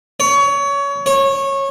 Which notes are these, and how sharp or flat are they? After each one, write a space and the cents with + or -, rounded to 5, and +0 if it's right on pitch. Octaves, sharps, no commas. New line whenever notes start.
C#5 +25
C#5 -20